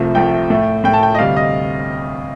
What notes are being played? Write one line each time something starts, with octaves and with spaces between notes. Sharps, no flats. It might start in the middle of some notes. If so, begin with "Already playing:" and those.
Already playing: C2 C3 F3 A3
C2 C3 F3 A3 G5
A2 A3
A2 A3 G5
A5
G5
D#5
D2 C3 G3 F5
D#5